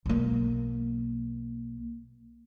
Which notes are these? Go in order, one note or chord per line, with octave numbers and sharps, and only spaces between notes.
B1 A#3